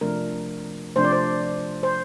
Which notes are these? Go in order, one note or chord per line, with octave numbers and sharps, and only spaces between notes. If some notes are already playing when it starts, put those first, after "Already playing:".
C3 F3 A3 D4 A#4
C3 F3 A3 D4 C5
D5
C5
C5